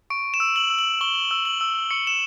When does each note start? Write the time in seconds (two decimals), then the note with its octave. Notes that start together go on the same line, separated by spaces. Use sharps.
0.10 C#6 D7
0.34 E7
0.40 E6
0.56 F#7
0.70 E6
0.79 F#7
1.01 C#6 G7
1.31 E6
1.45 F#7
1.61 E6
1.91 C#6 C#7
2.07 E7